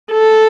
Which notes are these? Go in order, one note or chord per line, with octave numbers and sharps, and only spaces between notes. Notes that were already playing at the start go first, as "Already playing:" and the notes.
A4